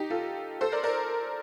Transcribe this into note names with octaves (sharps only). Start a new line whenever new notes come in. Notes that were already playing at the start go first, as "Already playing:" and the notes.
Already playing: D#4 G4
F4 A4
A4 C5
A#4 D5
A#4 D5